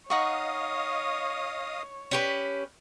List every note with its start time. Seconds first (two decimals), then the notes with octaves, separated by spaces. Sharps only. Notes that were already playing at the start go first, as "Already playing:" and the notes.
0.10 D#4 C#5 D#5 F5 F#5 C#6 D#6
2.11 C#4 G4 B4